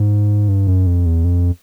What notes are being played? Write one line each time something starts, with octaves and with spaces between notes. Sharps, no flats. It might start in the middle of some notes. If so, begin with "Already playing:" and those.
Already playing: G#2
G2
F#2
F2
E2
F2